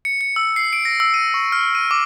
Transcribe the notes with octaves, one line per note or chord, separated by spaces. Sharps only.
C#7
C#7
E6
C7
D7
A#6
E6
D#7
C#6
F6
D#7
D6